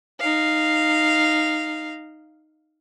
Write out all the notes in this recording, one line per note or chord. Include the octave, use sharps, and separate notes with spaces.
D#4 F5